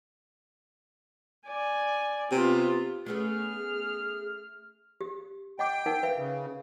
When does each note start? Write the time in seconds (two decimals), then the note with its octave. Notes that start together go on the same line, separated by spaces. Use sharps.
1.47 D5 G#5
2.32 C3 B3 F4
3.06 A3 B3 C#4 G#4 F6
5.01 G4
5.59 D#5 F#5 G5 D6
5.86 D#4 A#4 F#5
6.03 B4 E5 F5
6.18 C#3